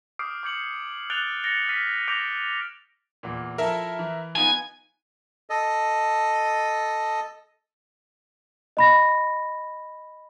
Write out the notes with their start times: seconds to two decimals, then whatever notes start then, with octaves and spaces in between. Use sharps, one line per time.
0.19 D6 D#6 F6 G6 C7 D7
0.43 D6 G6 G#6 C#7 F#7
1.10 F#6 G6 A6 D7 F7 G7
1.44 A6 A#6 C#7 D7 G7
1.69 F6 A6 B6 D#7
2.08 D6 G6 A#6 C#7 D7 F7
3.23 E2 A#2
3.58 F3 E4 A4 A#4 E5
3.99 E3
4.36 B3 D#4 F4 G#5
5.50 A4 D#5
8.77 D#5 B5 A#6